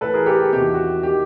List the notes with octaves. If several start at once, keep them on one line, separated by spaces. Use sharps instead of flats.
A2 E3 A4 B4
G#4 A#4
G4 A4
G4
E2 C3 D#3 G4
F#4
F#4
D#3 G4